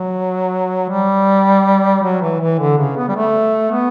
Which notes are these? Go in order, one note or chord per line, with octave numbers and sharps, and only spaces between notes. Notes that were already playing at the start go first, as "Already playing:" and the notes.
Already playing: F#3
G3
F#3
E3
E3
D3
C#3
B3
G3
A3
B3